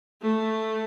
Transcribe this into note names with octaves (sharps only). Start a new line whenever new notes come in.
A3